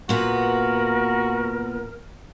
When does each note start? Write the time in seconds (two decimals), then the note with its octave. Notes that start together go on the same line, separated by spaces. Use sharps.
0.09 A#2 B3 F#4 A#4